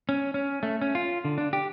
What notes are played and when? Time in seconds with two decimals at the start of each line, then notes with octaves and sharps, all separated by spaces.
0.09 C#4
0.34 C#4
0.63 A3
0.81 C#4
0.95 F4
1.25 D3
1.38 D4
1.53 G4